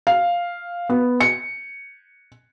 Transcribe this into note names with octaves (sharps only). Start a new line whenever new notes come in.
F5
B3
C#7